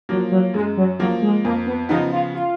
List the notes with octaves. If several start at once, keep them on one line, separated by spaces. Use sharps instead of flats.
F3 F#3 A#3
F#3
F#2 G#3
F#3
F3 F#3 A#3
G#3
F2 A#3
B3
C#3 F3 B3 D#4
F4
F4